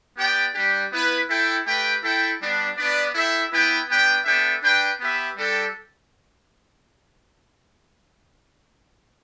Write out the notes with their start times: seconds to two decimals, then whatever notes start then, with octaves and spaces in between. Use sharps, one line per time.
0.17 B3 G4 D5 G5
0.55 G3 D4 G4
0.91 B3 E4 B4
1.29 E4 A4 E5 G5
1.65 A3 G4 B4 G5
2.03 E4 A4 E5 G5
2.40 G3 B3 D4
2.76 B3 D4 B4 D5
3.14 E4 A4 E5 G5
3.51 B3 E4 B4 G5
3.88 B3 D4 B4 G5
4.25 B3 D4 A4 E5 G5
4.62 D4 B4 G5
4.99 B3 G4 B4 E5
5.36 G3 D4 A4 G5